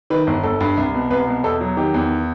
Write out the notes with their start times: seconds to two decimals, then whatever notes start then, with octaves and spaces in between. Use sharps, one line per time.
0.10 D#3 B4
0.27 G1
0.44 G1 A4
0.61 G2
0.77 C2
0.94 B2
1.10 C2 B4
1.27 B2
1.43 E2 A4
1.61 F#3
1.77 D#3 G4
1.94 E2